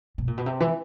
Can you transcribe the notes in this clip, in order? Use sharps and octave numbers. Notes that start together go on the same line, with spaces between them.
B2
A#2
B2
C3
E3